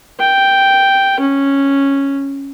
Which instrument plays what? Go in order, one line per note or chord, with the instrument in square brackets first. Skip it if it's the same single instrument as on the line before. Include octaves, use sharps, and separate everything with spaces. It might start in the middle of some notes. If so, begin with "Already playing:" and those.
[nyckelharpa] G5
C#4